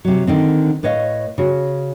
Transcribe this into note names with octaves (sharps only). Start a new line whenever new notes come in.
C3 F#3
D3 D#3 C4
A2 B4 C#5 D#5 F5
C#3 F#4